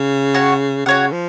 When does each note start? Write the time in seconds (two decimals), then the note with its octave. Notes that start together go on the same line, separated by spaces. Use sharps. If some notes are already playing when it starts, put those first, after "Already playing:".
Already playing: C#3
0.34 F#4 C#5 F#5
0.86 C#3 F#4 C#5 F#5
1.13 F3